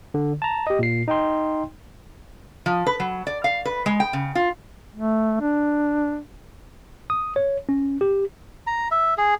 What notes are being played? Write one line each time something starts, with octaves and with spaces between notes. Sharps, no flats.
D3
A5 A#5
G4 D#5
A#2 C7
D#4 D#5 G5 C6
F3
B4
F#3
D5
F5
B4
G#3
G5
C#3
F4
A3
D4
D#6
C#5
C#4
G4
A#5
E5
G#4